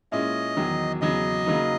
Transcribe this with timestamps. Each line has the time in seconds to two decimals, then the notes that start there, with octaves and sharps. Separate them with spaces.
0.12 A#2 G#3 C#4 E4 D#5
0.57 E2 D#3 F#3
1.01 E2 C#3 F#3 D#5
1.46 C#3 F#3 A#3 D#4